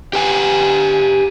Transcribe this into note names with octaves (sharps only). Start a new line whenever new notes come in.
G4 B4 G#5